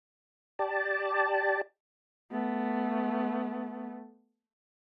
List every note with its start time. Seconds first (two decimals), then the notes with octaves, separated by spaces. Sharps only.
0.59 G4 D5 A5
2.32 A3 B3